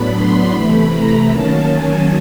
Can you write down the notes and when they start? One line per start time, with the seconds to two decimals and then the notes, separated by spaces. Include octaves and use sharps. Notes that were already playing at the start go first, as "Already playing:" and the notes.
Already playing: A2 F#3 B3 D4 B5
0.13 C6
0.52 C3 E3 A3 B5
0.90 A#5
1.29 D#3 F#3 A#3 C#4 A5
1.68 G#5